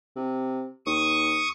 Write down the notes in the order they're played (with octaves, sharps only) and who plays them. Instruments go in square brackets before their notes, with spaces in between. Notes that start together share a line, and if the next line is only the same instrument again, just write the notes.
[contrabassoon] C3
[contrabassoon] D#2 [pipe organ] C#6 D#6